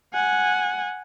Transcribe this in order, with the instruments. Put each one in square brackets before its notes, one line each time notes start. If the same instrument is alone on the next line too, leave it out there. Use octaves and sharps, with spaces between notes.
[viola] F#5 G#5